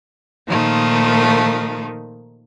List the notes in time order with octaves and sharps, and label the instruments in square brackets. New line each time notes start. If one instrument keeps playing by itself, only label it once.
[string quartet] A#2 D#3 F3 A3 D#4